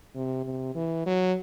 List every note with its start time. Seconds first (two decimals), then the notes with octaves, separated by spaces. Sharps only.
0.15 C3
0.45 C3
0.75 E3
1.06 F#3